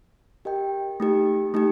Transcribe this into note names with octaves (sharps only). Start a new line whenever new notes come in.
G4 A#4 D#5 G5
A3 D#4 G4
A3 D#4 G4